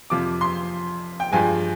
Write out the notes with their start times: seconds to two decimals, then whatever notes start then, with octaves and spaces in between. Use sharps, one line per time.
0.10 F2 C3 F3 D6
0.41 C6
1.20 G5
1.32 G2 F3 G#3 G#5